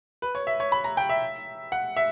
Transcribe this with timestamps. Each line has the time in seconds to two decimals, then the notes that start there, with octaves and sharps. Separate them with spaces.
0.22 B4
0.35 C#5
0.47 E5
0.60 C#5
0.72 B5
0.84 A#5
0.97 G5
1.09 E5
1.72 F#5
1.97 E5